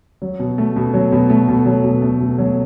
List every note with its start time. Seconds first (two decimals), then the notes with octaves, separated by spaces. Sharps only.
0.22 F#3
0.39 B2
0.58 A3
0.76 B2
0.94 F#3
1.12 B2
1.30 A3
1.48 B2
1.66 F#3
1.84 B2
2.02 A3
2.20 B2
2.38 F#3